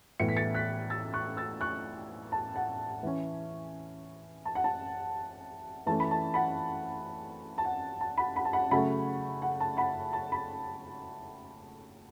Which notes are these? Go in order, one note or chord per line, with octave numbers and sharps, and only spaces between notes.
A2 E3 B3 C#7
B6
A6 C#7
F#6 B6
E6 A6
C#6 F#6
E6 A6
C#6 F#6
A5
F#5
E3 C#4
A5
F#5
A5
E3 A3 C#4 A5
B5
A5
F#5 B5
A5
F#5
A5
F#5 B5
F#5 B5
A5
F#5 B5
C#3 F#3 A3 C#4 F#5 B5
F#5
A5
F#5 B5
A5
B5